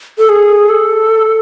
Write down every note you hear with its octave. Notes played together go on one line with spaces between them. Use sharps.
A4
G#4
A4